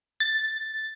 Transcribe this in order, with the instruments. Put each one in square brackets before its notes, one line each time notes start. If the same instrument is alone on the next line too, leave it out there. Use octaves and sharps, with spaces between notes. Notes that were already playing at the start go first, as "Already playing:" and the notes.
[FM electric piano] A6